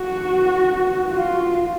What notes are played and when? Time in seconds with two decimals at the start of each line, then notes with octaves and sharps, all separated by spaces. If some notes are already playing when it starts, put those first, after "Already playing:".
Already playing: F#4
1.11 F4